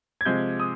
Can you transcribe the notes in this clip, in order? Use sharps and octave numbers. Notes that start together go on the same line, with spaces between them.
G#6
C3 F3 G#3 G6
D#6